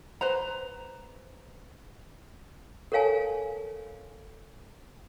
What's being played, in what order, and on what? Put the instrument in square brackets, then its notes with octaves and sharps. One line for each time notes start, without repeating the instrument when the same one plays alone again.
[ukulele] B4 C5 A#5
[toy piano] A4 A#4 C#5 F5 G#5 A5